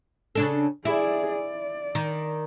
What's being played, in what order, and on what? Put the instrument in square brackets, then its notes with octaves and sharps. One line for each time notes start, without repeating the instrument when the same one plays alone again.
[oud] C#3 D4 A4
[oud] E4 [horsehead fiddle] G#4 D5
[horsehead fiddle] D5
[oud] D#3